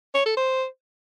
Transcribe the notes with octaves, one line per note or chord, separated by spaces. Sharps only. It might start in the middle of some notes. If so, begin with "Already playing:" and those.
C#5
A4
C5